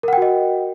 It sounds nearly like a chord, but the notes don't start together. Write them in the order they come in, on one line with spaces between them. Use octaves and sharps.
A#4 F#5 G5 F#4 D#5